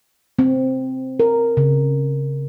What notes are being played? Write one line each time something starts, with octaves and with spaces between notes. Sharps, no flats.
C4
A#4
C#3